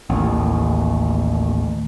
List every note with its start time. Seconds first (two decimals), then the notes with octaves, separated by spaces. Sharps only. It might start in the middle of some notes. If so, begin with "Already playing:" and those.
0.10 A1 D#2